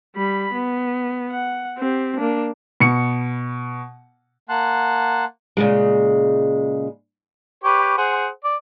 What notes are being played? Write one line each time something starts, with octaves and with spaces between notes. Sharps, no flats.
G3 B5
B3
F#5
C4 G4
A#3 D4
B2 C#7
A#3 F#5 A5 C6 F#6
A#2 C#3 G#3
G4 B4 C#5
G#4 C5 F#5
D5